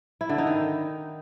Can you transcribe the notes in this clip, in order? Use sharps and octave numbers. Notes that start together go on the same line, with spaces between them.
E4
D3
D#4
D#3